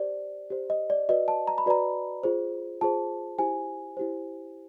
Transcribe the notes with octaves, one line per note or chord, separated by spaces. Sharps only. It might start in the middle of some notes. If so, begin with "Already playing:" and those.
Already playing: G4 C5 D5
G4 C5
D#5
D5
F#4 B4 D5 D#5
A5
A#5
B5
F#4 B4 D5 A#5
F4 G#4 C5
F4 G#4 C5 A5
E4 G4 C5 G#5
E4 G4 C5